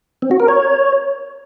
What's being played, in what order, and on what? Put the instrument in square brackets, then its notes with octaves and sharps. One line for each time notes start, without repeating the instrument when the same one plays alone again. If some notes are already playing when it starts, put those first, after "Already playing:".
[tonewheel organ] C4
F#4
A#4
C#5